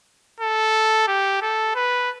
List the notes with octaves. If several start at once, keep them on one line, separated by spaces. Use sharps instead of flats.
A4
G4
A4
B4